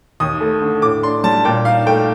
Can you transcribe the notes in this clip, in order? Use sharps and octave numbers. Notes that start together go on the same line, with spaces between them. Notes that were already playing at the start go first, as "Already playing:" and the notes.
D#2 D#6
A3
D3
A2 D6
D4 C6
G3 A5
A#2 G5
D#4 F5
A3 G5